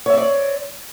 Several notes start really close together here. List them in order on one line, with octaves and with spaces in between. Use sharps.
C#5 E5 C4 D5